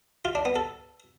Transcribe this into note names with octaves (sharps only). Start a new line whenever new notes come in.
F4
D4
B3
A4